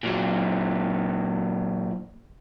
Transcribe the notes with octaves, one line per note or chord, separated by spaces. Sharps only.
A#2 F#3